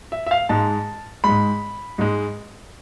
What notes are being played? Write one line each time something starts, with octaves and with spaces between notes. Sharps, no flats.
E5
E5
F5
G#2 G#3 A5
G#2 G#3 B5
G#2 G#3